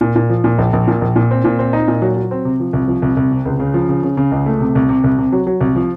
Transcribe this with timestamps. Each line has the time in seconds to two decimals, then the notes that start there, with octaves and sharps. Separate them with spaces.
0.01 A#2
0.16 A#2
0.30 F3
0.44 A#2
0.58 A#1
0.73 A#1
0.88 A#2
1.02 A#1
1.16 A#2
1.31 C4
1.45 A#2
1.59 C4
1.73 D#4
1.88 A#2
2.02 F#3
2.17 F#3
2.31 C4
2.45 C3
2.60 F3
2.73 C2
2.88 F3
3.02 C2
3.17 C2
3.31 C3
3.45 C#2
3.60 C#3
3.74 F3
3.89 C#3
4.03 C#3
4.17 C#3
4.31 C#2
4.46 A3
4.60 C3
4.75 C2
4.89 C3
5.04 C2
5.18 C3
5.32 F#3
5.47 F#3
5.61 C2
5.76 F3